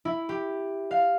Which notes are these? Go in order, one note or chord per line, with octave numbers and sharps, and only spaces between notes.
E4
G4
F5